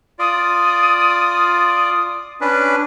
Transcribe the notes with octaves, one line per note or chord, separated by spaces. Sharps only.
F4 D5 D#6
C#4 D4 B4